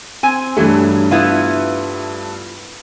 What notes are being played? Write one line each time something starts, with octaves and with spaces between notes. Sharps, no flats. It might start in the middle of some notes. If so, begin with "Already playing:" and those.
C4 G#5
G2 E3 F#3 A3
B3 E4 F4